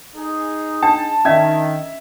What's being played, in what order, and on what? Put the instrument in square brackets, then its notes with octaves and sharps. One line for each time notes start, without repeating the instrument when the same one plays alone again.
[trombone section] D#4 G#4
[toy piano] D4 G5 [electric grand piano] A5
[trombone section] D#3 [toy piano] C#4 [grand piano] E5 G#6